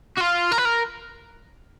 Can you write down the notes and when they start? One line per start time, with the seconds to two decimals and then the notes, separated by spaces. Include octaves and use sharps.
0.17 F#4
0.20 F4
0.52 A#4
0.58 B4
0.65 A#4